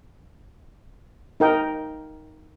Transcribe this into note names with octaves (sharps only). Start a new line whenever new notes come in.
D#4 A#4 G5 D#6